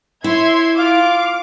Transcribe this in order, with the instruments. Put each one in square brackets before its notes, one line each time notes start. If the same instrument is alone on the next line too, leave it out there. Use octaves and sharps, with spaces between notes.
[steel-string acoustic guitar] E4 [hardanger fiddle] C#5 [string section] E5 C6 G#6
[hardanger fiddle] F4 [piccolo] F5 [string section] D6